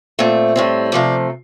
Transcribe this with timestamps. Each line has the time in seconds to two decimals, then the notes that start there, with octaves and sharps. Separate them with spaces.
0.19 A#2 A3 C4
0.56 A2 G3 C4
0.92 C3 F3 A3 D5